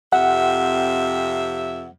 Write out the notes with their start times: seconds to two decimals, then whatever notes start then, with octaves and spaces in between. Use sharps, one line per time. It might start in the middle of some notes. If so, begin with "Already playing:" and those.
0.13 F2 C3 E5 F#5